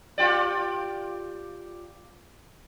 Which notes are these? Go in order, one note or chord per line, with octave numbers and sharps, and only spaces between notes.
F4 G4 D5